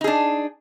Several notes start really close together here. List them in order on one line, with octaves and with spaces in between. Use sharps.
D#4 G#4 D4